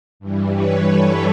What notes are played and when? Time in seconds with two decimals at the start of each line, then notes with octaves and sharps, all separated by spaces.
0.20 G2 E3 G3
0.54 B4 C#5
0.87 A4 B4